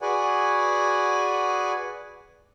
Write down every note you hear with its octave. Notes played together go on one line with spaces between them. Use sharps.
F#4 G#4 B4 D5 F#5 G#5